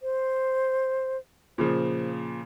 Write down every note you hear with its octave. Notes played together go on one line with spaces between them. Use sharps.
C5
A#2 C#3 F3 C5